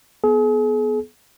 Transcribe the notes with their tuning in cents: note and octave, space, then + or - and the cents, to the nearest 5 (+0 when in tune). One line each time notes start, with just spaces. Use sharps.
B3 +0 G#4 +40